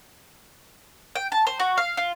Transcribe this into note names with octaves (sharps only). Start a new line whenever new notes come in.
G5
A5
C5
F#4
F5
F4